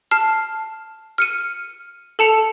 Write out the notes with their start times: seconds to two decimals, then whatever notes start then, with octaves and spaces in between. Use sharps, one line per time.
0.11 A5 F6 C7
1.18 F6 C#7 D#7
2.19 A4 A5 C#7 F7